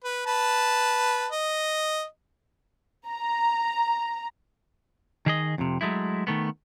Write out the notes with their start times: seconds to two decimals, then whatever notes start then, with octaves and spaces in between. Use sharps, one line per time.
0.04 B4
0.26 B4 A5 B5
1.32 D#5
3.08 A#5
5.26 D#3 G#4 D#5
5.58 F2 C3
5.81 F#3 G#3 A3 E4
6.27 D#3 A3 B3